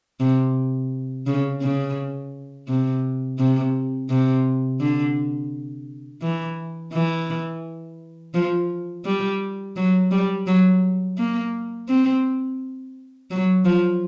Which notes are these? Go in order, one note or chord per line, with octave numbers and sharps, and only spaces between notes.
C3
C#3
C#3
C3
C3
C3
D3
E3
E3
F3
G3
F#3
G3
F#3
A#3
C4
F#3
F3